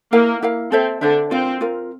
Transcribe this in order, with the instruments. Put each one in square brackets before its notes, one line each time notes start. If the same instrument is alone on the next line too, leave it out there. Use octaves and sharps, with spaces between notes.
[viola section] A#3 [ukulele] E4 A#4 F5
[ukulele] E4 A#4 F5
[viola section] C4 [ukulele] A4 C5 E5
[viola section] D3 D4 [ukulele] A4 C5 E5
[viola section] C4 [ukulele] F4 A#4 F5
[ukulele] F4 A#4 F5